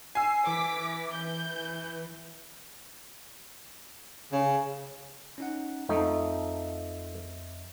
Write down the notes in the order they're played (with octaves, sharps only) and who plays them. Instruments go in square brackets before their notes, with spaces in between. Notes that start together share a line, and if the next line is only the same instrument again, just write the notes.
[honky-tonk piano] G#5 E6 [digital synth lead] C7
[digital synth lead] E3 [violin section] D6 B6
[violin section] G6
[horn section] C#3
[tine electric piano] C#4 D#4 F#5
[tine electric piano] F2 D#5 E5 [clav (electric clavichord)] F3 A3 D#4